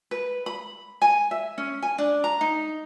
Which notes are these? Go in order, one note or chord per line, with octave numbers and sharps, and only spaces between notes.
B4
B5
G#5
E5
C#4
G#5
D4
A#5
D#4